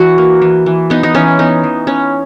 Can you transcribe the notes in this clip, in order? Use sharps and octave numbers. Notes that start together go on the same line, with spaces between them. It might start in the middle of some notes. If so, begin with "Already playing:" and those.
Already playing: E3 F#4
A#3
E3
E3
B3 D#4
D#4
E3 C#4
B3 D#4
E3
B3 C#4